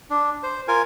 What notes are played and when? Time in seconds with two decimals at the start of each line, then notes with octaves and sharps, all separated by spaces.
0.10 D4
0.43 C5
0.68 F4 A#4 G#5